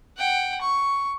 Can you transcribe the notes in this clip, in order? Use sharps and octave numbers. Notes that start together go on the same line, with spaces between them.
F#5 G5
C#6